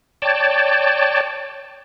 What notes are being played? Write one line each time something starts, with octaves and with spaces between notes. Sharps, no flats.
C#5 D5 G5 A5